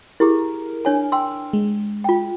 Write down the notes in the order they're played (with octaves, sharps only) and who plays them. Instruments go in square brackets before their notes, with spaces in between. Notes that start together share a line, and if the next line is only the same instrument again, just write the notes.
[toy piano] E4 G4 G#4 [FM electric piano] A#4
[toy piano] D4 C#5 G#5
G5 C6 E6
[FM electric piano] G#3
[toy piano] F4 G5